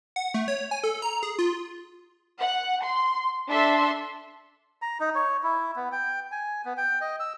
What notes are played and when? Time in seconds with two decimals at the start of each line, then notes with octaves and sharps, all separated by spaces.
0.16 F#5
0.34 A3
0.48 C#5
0.71 G#5
0.84 A4
1.02 A#5
1.23 G#4
1.39 F4
2.41 F#5
2.84 C6
3.49 D4 A4 E5 C6
4.82 A#5
5.00 D#4
5.15 C#5
5.43 E4
5.76 B3
5.92 G5
6.32 G#5
6.65 B3
6.77 G5
7.01 D#5
7.20 E6